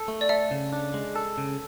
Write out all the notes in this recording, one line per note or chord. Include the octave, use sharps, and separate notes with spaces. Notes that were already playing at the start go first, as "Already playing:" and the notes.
Already playing: A4
A3
D5
A4 E5
C#3
D4
G#3
A4
C#3